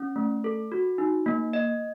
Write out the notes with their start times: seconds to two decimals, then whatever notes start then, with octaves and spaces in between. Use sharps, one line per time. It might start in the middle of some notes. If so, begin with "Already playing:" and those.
Already playing: C#4
0.16 A3
0.44 A4
0.72 F#4
0.98 D#4
1.26 A#3
1.53 D#5